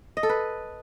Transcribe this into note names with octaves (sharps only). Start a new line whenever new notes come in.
D#5
A4
B4